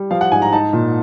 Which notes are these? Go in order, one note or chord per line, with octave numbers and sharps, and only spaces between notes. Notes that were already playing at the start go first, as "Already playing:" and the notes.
Already playing: G3
F3 F5
F#5
G#2 G#5
A#5
D#4 A5
A#2